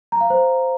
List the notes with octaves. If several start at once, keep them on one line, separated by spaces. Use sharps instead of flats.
A#5
F5
C5